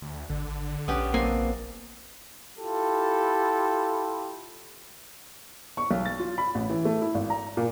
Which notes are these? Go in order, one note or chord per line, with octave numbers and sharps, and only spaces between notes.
D2
G#1 D3
A#1 B3 C#4 G4
F#1 A#3 C4 D4 G#5
E4 F4 G4 A4
C#6
B1
A6
F4
B5
A1
E3
A3
E4
G#1
A#5
A#2